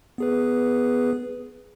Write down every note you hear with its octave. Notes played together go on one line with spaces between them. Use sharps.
B3 G#4 B4